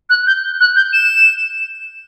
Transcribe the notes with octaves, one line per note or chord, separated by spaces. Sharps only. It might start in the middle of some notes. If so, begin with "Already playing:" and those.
F#6
G6
F#6
G6
E7